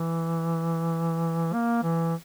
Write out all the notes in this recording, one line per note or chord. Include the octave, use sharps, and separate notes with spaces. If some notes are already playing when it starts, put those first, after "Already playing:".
Already playing: E3
A#3
E3